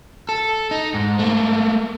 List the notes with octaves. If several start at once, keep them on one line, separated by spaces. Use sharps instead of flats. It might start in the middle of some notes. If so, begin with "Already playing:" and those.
A4
D#4
G#2
A3 A#3